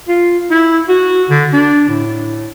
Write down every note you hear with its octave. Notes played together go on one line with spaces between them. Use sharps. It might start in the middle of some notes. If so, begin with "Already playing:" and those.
F4
E4
F#4
D3
D4
A2